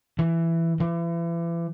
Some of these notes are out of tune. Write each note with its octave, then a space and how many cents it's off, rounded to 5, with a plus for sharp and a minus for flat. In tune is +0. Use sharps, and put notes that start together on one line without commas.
E3 +10
E3 +35